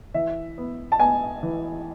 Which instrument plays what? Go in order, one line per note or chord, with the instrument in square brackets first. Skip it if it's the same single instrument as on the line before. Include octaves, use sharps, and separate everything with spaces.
[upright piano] E3 E5
B3
A5
B3 G#5
E3